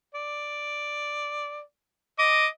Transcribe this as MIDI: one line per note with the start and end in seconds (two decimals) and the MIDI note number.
0.14 1.59 74
2.18 2.47 75
2.18 2.47 86